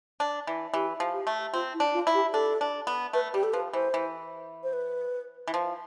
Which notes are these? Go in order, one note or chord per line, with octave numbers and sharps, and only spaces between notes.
D4
E3
E3 G4
F3
G4
A3
C4 F4
E4
D4
F4
E4
G4
D4 A4
D4
B3
A3 B4
G3 G4
A4
F3 B4
E3 C5
E3
C5
B4
E3
F3